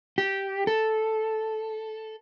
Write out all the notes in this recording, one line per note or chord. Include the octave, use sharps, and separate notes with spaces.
G4
A4